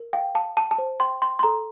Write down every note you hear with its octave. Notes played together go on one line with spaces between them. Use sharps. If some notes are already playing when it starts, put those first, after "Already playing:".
Already playing: A#4
F5 G5
F5 A5
G5 A5
A5
C5
G5 C6
G5 C6
C6
A4 A#5